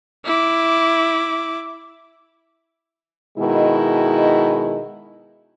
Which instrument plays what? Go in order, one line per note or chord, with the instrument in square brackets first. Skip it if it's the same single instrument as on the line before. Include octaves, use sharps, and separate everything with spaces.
[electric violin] E4 D6
[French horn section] B2 D#3 G#3 E4